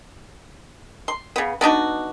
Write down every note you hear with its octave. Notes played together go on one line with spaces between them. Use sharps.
C6
C#3 B3
B3 D4 D#4 F#4